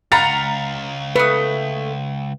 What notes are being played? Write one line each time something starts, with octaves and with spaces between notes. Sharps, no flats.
C#2 F5 F#5 A#5 B5 A6
A3 B4 D#6